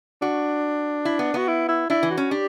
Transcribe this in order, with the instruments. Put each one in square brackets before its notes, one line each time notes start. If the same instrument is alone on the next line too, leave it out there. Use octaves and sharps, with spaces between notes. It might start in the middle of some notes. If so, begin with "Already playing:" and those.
[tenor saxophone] D4 [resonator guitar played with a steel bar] F#4
[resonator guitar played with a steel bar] E4
B3
[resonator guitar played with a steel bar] B3 [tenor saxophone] F#4
[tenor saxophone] E4
E4
[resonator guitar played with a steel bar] D4 [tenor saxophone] E4
[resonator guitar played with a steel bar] E3
[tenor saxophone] F#4
[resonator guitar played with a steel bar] C#4
[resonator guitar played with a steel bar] D4 [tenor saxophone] G4